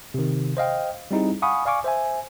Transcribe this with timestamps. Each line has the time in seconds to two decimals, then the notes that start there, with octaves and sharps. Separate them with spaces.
0.14 C3 D#3
0.57 C5 D#5 F5 G5
1.11 G3 C4 D#4 E4 G#4
1.42 F5 F#5 G#5 B5 C#6 D#6
1.65 D5 F5 G#5 C#6 D6
1.84 C5 E5 G#5